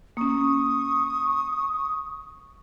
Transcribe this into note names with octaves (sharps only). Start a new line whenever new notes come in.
A#3 C#4 C#6 D#6